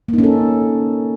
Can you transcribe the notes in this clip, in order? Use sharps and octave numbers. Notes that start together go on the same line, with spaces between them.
A#3 C#4 D#4 A4